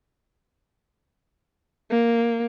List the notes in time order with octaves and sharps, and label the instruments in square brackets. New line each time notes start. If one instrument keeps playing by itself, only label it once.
[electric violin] A#3